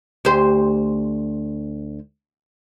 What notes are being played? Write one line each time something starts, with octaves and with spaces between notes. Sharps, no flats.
D2 G4 C5